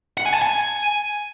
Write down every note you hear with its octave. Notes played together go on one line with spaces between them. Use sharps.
F#5
G#5
A5
G#5